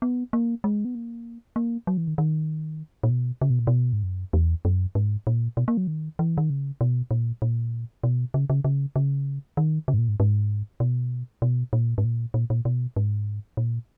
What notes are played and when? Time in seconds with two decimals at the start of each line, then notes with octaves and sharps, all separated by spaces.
0.02 B3
0.33 A#3
0.64 G#3
0.85 B3
0.95 A#3
1.56 A#3
1.87 F#3
1.97 E3
2.08 D#3
2.18 D#3
3.03 A#2
3.10 B2
3.42 C#3
3.50 B2
3.59 A#2
3.67 B2
3.93 G#2
4.03 F#2
4.33 E2
4.65 F#2
4.95 G#2
5.27 A#2
5.57 B2
5.68 A#3
5.77 F#3
5.87 D#3
6.19 E3
6.38 D#3
6.50 C#3
6.81 B2
7.11 A#2
7.42 A#2
8.04 B2
8.34 C#3
8.50 C#3
8.64 C#3
8.96 C#3
9.57 D#3
9.88 C#3
9.94 G#2
9.98 A#2
10.09 G#2
10.20 G#2
10.80 B2
11.42 B2
11.73 A#2
11.98 G#2
12.04 A#2
12.34 A#2
12.50 A#2
12.65 B2
12.96 G#2
13.57 A#2